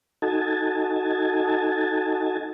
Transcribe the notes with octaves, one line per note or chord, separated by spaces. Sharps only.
D#4 F#4 A4 G#5 A5